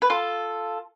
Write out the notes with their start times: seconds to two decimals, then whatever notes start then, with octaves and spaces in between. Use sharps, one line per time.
0.02 B4
0.10 F4 A4